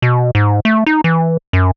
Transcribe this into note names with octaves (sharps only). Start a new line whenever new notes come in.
B2
G#2
A3
D#4
E3
F#2